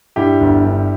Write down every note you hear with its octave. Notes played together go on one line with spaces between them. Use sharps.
G2 E4 G4
G1
G2